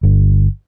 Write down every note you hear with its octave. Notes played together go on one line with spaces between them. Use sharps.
G1